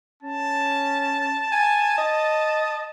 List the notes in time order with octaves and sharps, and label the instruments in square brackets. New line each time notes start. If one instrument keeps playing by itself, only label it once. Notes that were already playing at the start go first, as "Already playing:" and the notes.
[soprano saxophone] C#4 [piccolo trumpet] A5
[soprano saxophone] G#5
D#5